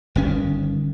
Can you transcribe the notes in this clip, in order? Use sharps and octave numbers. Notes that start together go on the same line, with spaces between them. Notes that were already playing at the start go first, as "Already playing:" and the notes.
G1 D#3 C#4